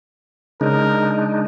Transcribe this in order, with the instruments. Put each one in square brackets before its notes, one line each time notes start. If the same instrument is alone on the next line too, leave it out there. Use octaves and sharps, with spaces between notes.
[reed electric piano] C#3 [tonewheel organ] G#3 D4 D#4 [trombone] A#4